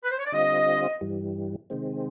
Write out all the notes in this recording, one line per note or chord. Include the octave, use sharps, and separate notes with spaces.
B4
C5
C#5
D5
D3 G3 C4 F4 D#5
G2 E3 G3
C3 D#3 G#3 C4